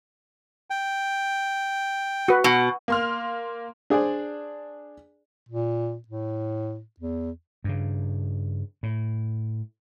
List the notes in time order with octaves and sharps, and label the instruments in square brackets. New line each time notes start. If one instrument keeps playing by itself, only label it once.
[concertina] G5
[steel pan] F#4 B4
[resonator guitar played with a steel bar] B2
[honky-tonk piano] A#3 C6 F6
[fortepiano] D4 G#4 C5 D5
[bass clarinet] A#2
A2
E2
[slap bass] G2 C#3
A2